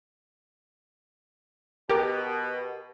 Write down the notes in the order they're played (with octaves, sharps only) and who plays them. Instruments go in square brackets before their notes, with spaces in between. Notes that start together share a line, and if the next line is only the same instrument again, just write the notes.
[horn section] B2 [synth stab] G4 A#4